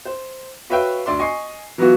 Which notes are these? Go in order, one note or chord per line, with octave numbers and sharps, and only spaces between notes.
C5
F#4 B4 C#5 E5 F5 G5
D2 D5 E5 C6
D#5 G#5 C#6 C7
E3 F#3 B3 F4 F#4